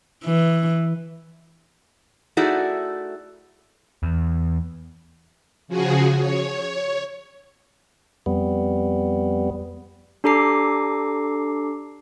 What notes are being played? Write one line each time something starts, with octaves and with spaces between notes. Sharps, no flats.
E3
A3 D#4 E4 F#4 G#4 D5
E2
C#3 F3 F#4 G#4
C#5
F2 G3 B3
D4 G4 A4 A#5 D6 C7